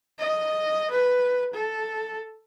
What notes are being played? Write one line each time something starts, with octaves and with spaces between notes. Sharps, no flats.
D#5
B4
A4